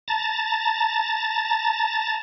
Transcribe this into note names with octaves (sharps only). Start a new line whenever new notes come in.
A5 A#5 A6